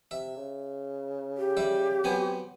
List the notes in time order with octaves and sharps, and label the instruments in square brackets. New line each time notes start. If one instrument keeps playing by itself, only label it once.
[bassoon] C3 [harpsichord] E5
[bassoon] C#3
[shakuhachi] G4
[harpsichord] G3 E5
[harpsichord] F#3 B3 G#5 [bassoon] C4